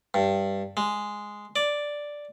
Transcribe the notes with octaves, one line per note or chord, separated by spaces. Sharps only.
G2
G#3
D5